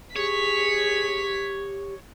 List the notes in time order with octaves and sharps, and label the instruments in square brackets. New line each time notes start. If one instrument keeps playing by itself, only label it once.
[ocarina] G4 [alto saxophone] G#4 [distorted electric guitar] C#5 [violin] B6